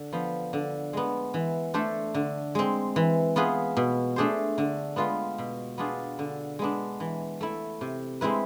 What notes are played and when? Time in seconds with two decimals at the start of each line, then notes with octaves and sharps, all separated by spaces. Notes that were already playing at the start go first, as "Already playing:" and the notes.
Already playing: D3
0.13 F3 B3
0.53 D3
0.93 G#3 B3
1.34 E3
1.74 A3 D4 A4 C5
2.14 D3
2.55 G#3 C4
2.96 E3
3.36 B3 F4 G#4 B4
3.77 B2
4.16 A3 D4 G#4 C5
4.58 D3
4.96 G#3 B3 F4 B4
5.38 B2
5.78 B3 D4 F4 G#4
6.19 D3
6.59 G#3 B3 D4
7.00 E3
7.41 A3 E4
7.81 C3
8.21 G#3 C4 E4 B4